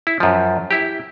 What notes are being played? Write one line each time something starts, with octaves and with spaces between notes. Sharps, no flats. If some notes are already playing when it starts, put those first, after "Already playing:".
E4
F#2 F3
E4 G4